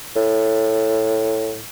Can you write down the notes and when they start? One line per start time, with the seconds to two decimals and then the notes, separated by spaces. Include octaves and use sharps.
0.16 A2